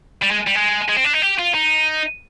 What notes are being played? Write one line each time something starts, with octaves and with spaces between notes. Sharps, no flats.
G3
G#3
G3
G#3
G#3
C4
D4
D#4
G4
F4
D#4